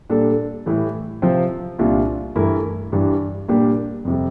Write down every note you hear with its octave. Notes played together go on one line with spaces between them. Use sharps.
A#2 G3 D4 A4
A2 E3 G3
C3 F3 C4 F4
C2 A#2 G3 D4 F4
G2 E3 A3 E4 A#4
G2 E3 G3 D4
A#2 G3 A#3 D4 G4
F2 C3 G3